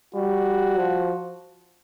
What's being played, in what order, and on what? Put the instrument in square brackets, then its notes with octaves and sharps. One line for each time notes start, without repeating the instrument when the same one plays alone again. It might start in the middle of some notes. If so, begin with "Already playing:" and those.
[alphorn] G3 [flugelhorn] F#4
[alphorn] F3